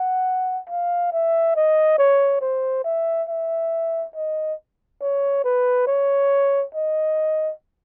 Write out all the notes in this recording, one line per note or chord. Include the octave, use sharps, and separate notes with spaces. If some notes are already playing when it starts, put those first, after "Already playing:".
Already playing: F#5
F5
E5
D#5
C#5
C5
E5
E5
D#5
C#5
B4
C#5
D#5